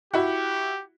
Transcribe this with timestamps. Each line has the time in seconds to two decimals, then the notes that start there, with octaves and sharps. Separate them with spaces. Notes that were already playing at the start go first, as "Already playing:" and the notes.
0.14 E4 F#4 G4